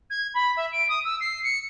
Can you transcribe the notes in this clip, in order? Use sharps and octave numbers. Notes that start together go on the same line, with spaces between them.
G#6
B5
E5
D7
D#6
E6
C7
C#7